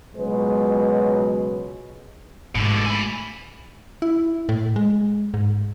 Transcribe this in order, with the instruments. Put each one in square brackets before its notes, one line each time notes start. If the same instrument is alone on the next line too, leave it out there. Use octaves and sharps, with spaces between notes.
[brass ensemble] C#2 B2 F#3 G#3 B4
[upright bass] G#2 A3 [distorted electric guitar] B2 D3
[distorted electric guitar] G#5 B5
[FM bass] E4
A2
G#3
G#2